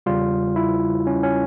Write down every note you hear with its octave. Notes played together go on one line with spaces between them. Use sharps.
E2 C#3 G3 F4
E4
C#4
C#4